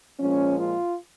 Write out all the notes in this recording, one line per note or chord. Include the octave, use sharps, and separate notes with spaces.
A#2 F3 G#3 C#4
F4